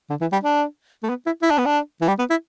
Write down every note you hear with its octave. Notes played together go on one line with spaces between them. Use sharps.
D3
E3
G3
D4
A3
B3
E4
E4
D4
B3
D4
E3
G3
B3
E4